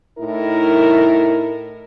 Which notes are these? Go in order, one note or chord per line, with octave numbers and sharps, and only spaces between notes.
A2 D#4 E4 A#4